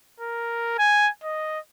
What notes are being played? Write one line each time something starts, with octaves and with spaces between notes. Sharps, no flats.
A#4
G#5
D#5